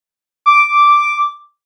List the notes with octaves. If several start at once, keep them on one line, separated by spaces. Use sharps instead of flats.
D6